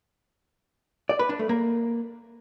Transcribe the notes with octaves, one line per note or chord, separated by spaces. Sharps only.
D5
B4
D4
A3
A#3